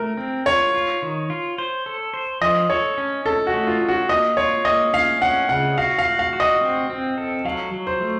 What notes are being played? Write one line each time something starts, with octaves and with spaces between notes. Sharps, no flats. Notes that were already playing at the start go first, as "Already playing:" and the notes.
Already playing: A3 A#4
C4
F4 C#5
F4
D#3
F4
C5
A4
C5
F3 D#5
A4 C#5
C#4
C#4 A4
F#4
A3
F4
C#4
F#4
A#3 D#5
F4 C#5
A#3 D#5
C#4 F5
C#4 F#5
C#3 F#5
F#4 F5
F5
F#4
F5
F#4
D#5
C4
C4
A4
F#3 F5
F#3
C5
A3